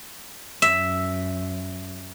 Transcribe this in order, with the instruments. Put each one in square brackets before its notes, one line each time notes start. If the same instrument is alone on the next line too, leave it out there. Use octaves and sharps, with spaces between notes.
[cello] F#2 [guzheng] E5